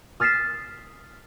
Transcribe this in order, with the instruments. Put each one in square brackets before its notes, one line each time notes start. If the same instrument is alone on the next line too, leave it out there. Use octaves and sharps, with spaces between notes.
[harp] D#6 F6 A6 B6 C7 E7